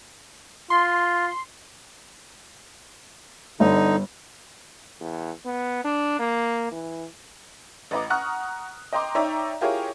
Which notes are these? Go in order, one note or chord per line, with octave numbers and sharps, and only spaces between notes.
F4 C6
G1 D3 D#4
E2
B3
D4
A#3
E3
A1 B4 D#5 A#5 D6
F#5 A#5 C#6 D#6 F6 F#6
D#5 G5 A#5 C6 D6
D#4 C#5 D5 E5 G5 A#5
E4 F4 G4 G#4 A#4 C#5